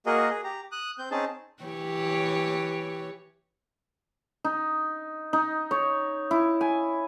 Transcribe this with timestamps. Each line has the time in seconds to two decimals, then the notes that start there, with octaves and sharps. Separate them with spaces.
0.06 A#3 F#4 G#4 A#4 D#5
0.30 G#4
0.44 G4 A#5
0.72 D#6 F#6
0.99 C4 G6
1.11 C4 C#4 D#4 G#4 A5
1.63 E3 G4 C#5
4.44 D#4
5.33 D#4
5.71 C#5
6.31 E4
6.61 G#5